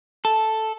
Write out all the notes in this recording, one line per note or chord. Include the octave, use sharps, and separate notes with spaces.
A4